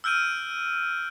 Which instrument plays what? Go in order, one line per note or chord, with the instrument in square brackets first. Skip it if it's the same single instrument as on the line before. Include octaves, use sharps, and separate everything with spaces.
[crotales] E6 F6 G6 D7 D#7